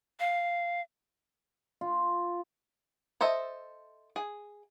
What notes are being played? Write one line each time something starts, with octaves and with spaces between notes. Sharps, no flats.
F5
F4
A4 C5 D#5 E5
G#4